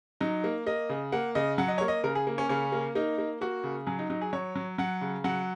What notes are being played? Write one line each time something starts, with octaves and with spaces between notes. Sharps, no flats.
F#3 D#4
A#3
A#3 D#5
C#3
A#3 F#5
C#3 D#5
F#3 F#5
D#5
A#3 C#5
D#5
C#3 A#4
G#4
A#3
C#4
C#3 C#4
A#3
A#3 D#4
A#3
A#3 F#4
C#3
F#3 G#4
D#4
F#3 D#4
G#4
F#3 C#5
F#3
F#3 F#5
C#3
F#3 F#5